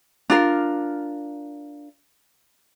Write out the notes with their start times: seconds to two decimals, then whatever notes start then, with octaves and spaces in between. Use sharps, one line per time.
0.30 D4 F4 A#4